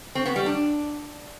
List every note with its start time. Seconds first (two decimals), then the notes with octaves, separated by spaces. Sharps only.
0.15 C4
0.26 B3
0.36 G3
0.46 D4